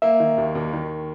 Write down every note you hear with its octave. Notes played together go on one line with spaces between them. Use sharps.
A#3 E5
D#3
D#2
D#2
D#3